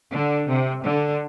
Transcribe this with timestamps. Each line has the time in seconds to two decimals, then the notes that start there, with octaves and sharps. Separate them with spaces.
0.14 D3
0.50 C3
0.83 D3